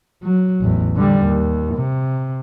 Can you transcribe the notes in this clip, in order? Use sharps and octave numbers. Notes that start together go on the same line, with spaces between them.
F#3
A1 E2
D3 G3
D#2
C3